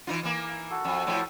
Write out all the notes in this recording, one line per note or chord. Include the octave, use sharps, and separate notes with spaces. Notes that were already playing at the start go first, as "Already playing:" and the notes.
E3 D#4 F4
E3 A#3
F#4 A4
F2
A2 F3 E4